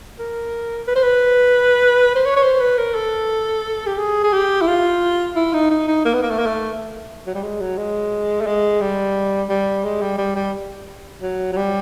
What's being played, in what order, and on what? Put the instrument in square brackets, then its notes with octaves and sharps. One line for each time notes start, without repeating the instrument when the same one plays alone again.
[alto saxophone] A#4
B4
C5
B4
C5
C#5
C#5
C5
B4
A#4
A4
G4
G#4
G#4
G4
E4
F4
E4
D#4
D#4
D#4
A#3
B3
A#3
A3
A#3
A3
F#3
G3
G#3
F#3
G#3
A3
G#3
G3
G3
G#3
G3
G3
G3
F#3
F#3
G3